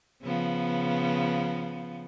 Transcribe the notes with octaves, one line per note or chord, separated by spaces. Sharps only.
C#3 F3 B3